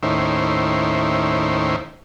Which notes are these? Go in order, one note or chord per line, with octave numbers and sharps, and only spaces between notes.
D#2 A2 D#3 C#4 E4 C5